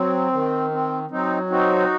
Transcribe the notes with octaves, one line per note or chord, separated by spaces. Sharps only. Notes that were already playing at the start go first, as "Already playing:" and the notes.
Already playing: F#3 C4
D#3
C4
F#3 C4 D#4
C4 D#4 F#4